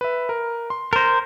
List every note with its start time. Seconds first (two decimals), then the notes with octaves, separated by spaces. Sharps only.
0.01 B4 E5
0.29 A#4
0.70 C6
0.93 A#4 C5 A6 A#6